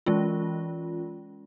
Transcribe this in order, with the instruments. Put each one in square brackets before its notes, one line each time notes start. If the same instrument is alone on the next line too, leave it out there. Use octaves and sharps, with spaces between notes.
[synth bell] E3 G#3 C#4 F4